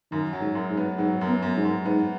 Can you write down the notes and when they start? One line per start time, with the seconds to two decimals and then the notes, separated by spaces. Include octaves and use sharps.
0.12 F#2 D#3
0.33 F#3
0.41 G#2
0.55 F#2
0.70 G#2
0.77 B3
0.98 G#2 F#3
1.21 F#2
1.28 B3
1.42 F#2
1.57 G#2
1.65 F#2
1.86 G#2 B3